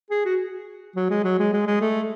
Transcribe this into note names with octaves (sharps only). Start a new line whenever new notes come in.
G#4
F#4
F#3
G#3
F#3
G#3
G#3
G#3
A3